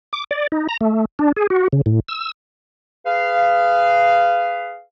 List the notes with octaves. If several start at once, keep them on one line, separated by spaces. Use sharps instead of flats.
D6
D5
D#4
A#5
A3
D4
G#4
F#4
C#3
A2
E6
G#4 B4 F5